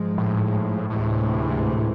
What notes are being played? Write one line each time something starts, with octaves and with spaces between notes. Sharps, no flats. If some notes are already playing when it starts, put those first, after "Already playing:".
Already playing: G#2 F3 G#3
A2
D2 A2 C3 E3 G#3
G#2
A2